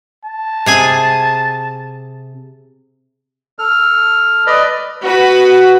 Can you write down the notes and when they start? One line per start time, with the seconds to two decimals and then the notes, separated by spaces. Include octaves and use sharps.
0.25 A5
0.66 C3 G#4 G#5
3.59 A4 F6
4.47 B4 D5 D#5
5.02 F#4 B4 B5